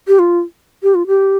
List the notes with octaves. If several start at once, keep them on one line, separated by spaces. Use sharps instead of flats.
G4
F4
G4
F4
G4